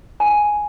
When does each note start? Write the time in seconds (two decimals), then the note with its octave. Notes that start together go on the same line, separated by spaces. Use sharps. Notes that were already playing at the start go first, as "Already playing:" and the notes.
0.20 G#5